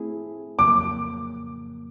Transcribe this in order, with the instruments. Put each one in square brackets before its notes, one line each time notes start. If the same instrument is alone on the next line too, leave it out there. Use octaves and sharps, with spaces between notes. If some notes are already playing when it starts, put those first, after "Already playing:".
Already playing: [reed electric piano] A3 C4 E4 G#4
[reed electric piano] F2 C#3 F#3 A#3 [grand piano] D6